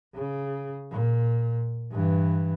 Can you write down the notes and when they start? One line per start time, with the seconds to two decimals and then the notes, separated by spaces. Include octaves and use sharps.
0.15 C#3
0.91 A#2
1.92 G2 E3